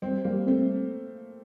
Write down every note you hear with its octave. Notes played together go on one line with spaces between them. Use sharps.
G3 C4
G3 A#3
A3 C4